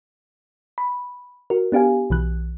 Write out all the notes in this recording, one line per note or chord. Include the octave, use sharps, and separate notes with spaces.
B5
F#4 A#4
B3 D4 G4 F5 G#5
B1 E3 F#6